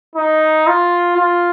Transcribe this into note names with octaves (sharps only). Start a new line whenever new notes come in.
D#4
F4
F4